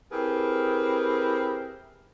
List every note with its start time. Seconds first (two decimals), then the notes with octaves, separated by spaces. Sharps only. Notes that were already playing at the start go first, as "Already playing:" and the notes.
0.11 C4 E4 G4 G#4 A#4 B4